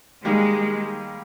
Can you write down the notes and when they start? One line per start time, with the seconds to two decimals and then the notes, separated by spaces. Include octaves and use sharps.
0.25 D#3 G3 G#3 A#3